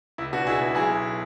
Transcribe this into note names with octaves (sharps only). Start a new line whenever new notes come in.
C#2 E4
B2 D4 F#4
C#2 E4 G#4
B2
B1 E4 G#4
B2